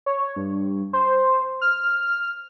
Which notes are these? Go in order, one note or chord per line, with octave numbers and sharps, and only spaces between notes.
C#5
G2
C5
F6